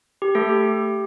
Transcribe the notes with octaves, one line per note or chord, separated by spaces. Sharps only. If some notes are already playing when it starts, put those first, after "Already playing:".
G4
A3 A4
G4